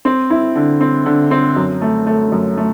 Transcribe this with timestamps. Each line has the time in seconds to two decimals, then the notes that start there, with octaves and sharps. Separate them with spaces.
0.05 C4
0.30 E4
0.55 D3
0.80 C4
1.06 D3
1.31 C4
1.56 F#2
1.81 A3
2.06 A3
2.32 F#2
2.57 A3